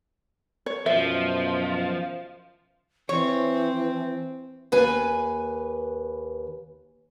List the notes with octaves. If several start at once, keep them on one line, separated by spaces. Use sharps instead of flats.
C#5
F#2 B2 F3 E5
E3 C4 C#5
D#2 B4 G#5